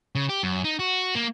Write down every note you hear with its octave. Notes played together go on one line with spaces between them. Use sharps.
C#3
G4
F#2
D#4
F#4
A#3